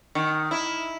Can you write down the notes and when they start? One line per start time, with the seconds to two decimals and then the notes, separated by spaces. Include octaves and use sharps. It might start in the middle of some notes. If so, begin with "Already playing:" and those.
0.15 D#3
0.51 E4